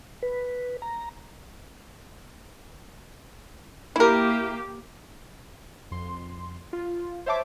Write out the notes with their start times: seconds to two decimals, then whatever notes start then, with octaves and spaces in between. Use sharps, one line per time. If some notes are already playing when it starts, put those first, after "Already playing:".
0.23 B4
0.82 A#5
3.96 A#3 E4 G4 A#4
5.91 F2 C6
6.73 F4
7.26 C5 C#5 E5 A5 D6